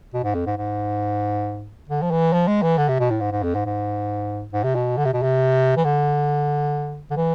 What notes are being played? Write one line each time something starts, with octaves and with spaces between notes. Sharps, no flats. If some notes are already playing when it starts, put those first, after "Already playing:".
B2
G#2
F2
G#2
G#2
D3
F3
E3
F3
G#3
E3
D3
C3
B2
A2
G#2
G#2
F2
G#2
G#2
G#2
C3
B2
D3
C3
B2
C3
E3
D3
D3
E3